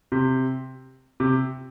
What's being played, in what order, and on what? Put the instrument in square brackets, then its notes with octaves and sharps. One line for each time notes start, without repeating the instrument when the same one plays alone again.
[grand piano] C3
C3